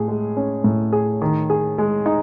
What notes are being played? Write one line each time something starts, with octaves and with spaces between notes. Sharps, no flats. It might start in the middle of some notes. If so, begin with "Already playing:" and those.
Already playing: A2 G#4
G#3
C#4
A2
G#4
D#3
G#4
G#3
D#4